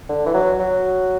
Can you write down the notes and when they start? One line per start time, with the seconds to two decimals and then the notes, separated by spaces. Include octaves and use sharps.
0.09 D3
0.26 E3
0.34 F#3
0.59 F#3